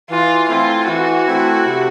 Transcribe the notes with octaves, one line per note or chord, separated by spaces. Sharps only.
E3 F4
A3 C4 E4 F4
E3 F#4
A3 C4 E4
C3